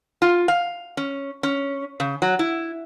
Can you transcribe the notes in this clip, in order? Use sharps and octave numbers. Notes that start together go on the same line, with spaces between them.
F4
F5
C#4
C#4
C#3
F#3
E4